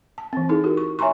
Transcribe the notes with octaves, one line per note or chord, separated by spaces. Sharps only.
A5
E3 C4
D#4 E4 G#4 A4
F#4 G4 A#4
C#6
C#5 E5 G#5 A#5 C6 C#6